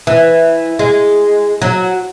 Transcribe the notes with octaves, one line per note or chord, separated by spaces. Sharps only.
E3
G#3
F#3